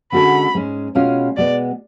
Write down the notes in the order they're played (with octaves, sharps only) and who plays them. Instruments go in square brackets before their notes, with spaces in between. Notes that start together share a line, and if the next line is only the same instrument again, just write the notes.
[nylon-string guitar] D3 G#3 C#4 F#4 A4 [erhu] B5
[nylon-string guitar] G#2 G#3 C#4
B2 G#3 C#4 F4
[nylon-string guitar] B2 G#3 B3 [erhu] D5